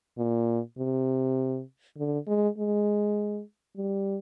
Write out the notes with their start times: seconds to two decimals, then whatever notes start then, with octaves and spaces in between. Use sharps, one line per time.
0.18 A#2
0.78 C3
1.97 D3
2.27 G#3
2.58 G#3
3.77 G3